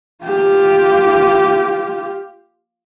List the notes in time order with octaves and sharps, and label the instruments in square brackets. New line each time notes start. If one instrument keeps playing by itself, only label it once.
[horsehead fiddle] F4 G4